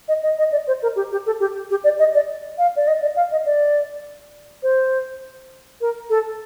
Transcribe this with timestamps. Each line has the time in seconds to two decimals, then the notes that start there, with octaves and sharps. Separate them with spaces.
0.08 D#5
0.23 D#5
0.38 D#5
0.52 D5
0.67 C5
0.82 A#4
0.96 G4
1.12 G4
1.26 A4
1.40 G4
1.70 G4
1.84 D5
1.99 D#5
2.14 D5
2.58 F5
2.76 D5
2.87 D#5
3.02 D5
3.16 F5
3.32 D#5
3.46 D5
4.63 C5
5.81 A#4
6.10 A4